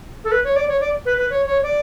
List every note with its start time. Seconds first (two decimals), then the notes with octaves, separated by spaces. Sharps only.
0.24 A4
0.32 B4
0.44 C#5
0.56 D5
0.68 C#5
0.80 D5
1.06 B4
1.18 B4
1.30 C#5
1.46 C#5
1.63 D5